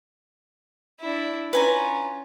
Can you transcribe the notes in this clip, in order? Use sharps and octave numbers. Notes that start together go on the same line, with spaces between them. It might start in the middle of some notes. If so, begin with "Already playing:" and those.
D4 E4
C#4 F4 B4 G#5 A#5